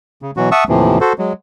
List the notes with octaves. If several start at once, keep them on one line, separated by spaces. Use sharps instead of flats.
C#3
B2 E3 F#3 F#4
E5 F#5 A5 C#6 D#6 E6
D#2 A2 C3 E3 F3
F#4 A4 C5
F#3 G#3